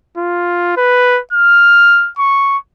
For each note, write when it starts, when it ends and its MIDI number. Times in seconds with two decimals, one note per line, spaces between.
0.18 0.76 65
0.77 1.20 71
1.33 2.10 89
2.19 2.58 85